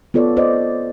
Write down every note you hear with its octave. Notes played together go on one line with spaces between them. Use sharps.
B3 F4 A4 C#5 D5
C5 D5 D#5